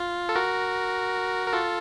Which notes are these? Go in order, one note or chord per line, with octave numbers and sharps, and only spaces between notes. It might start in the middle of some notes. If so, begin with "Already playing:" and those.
Already playing: F4
A4
F#4 A#4
A#4
F4 A4